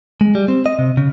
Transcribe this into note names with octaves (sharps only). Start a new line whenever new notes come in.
G#3
G3
C4
D#5
C3
C#3